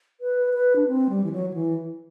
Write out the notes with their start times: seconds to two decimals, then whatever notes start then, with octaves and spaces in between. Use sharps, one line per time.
0.21 B4
0.54 B4
0.76 D4
0.88 C4
1.10 G3
1.24 E3
1.32 F#3
1.50 F#3
1.54 E3